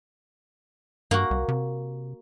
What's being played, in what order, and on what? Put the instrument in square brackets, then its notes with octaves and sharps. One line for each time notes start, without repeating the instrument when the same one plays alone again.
[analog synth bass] G2 [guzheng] A#3 F#4
[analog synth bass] C2
C3